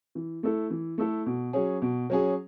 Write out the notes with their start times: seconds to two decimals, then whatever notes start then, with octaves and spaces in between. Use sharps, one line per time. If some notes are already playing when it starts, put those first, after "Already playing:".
0.15 E3
0.43 A3 E4 A4
0.70 E3
0.98 A3 E4 A4
1.26 B2
1.53 F#3 C#4 G#4
1.82 B2
2.10 F#3 C#4 G#4